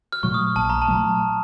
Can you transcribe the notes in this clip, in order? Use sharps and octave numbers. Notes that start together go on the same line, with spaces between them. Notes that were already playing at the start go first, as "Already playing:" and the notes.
F6
A#2 F#3 A3 C#6
D#6
A#1 A5
A#5
A5
A#2 F#3 A3